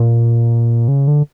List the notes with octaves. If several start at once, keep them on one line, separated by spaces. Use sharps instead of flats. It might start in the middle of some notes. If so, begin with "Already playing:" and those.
Already playing: A#2
C#3
D3